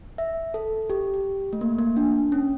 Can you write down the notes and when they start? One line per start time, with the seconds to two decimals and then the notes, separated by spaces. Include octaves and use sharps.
0.18 E5
0.54 A4
0.90 G4
1.14 G4
1.53 A3
1.61 A#3
1.79 A#3
1.97 D4
2.32 C#4